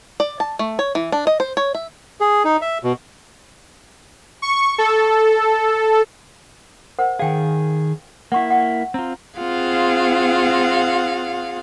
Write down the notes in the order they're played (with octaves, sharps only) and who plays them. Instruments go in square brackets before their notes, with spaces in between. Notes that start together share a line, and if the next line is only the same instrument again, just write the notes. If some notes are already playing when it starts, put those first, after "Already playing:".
[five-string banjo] D5
A5
A3
C#5
E3
D4
D#5
C5
C#5
E5
[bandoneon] G#4
D#4
E5
B2
[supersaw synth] C#6
A4
[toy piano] A#4 C5 F#5
[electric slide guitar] D#3 G#4 [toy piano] F5 G5 G#5
[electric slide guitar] A#3 E4 [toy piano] F#5 C#6
[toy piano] F#5
[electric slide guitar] C4 F4 [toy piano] A#5
[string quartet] C4 F4 G#4 F5 F#5